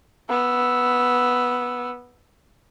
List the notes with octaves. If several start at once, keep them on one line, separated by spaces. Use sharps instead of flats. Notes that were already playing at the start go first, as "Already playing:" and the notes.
B3 E6